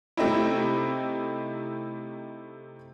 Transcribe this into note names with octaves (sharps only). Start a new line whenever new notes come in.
C3 A3 C4 D#4 E4